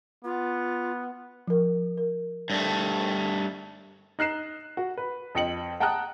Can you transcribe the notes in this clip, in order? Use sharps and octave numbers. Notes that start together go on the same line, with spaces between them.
B3 F4
F3 A#4
A#4
G2 A3
D#4 F#6 C7 E7
F#4
B4
F2 D#5 G5 C#7 F#7
F#5 G5 A5 A#5 D#6 F#6